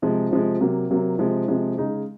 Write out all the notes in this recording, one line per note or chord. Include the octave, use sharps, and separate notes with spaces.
C3 F3 G#3
C3 F3 G#3
C3 F#3 A#3
C3 F#3 A#3
C3 F3 G#3
C3 F3 G#3
C#3 G#3 D#4 G#4